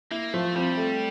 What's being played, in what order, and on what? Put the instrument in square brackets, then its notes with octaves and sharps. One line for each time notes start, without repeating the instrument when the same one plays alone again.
[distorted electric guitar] A#3 [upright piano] E4
[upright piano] F3 [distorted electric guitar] A3
[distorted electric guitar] G3 [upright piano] C4
[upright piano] A3